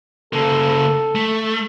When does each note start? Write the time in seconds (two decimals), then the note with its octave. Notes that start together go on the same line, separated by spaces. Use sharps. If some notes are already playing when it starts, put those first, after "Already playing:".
0.33 C#3 A#3 A4
1.15 A3